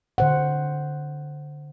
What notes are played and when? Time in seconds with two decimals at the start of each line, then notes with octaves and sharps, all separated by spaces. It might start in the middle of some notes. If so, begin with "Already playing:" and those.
0.18 D3 C5 F#5